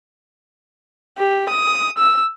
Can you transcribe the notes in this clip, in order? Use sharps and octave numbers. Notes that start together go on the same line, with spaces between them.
G4
D#6
E6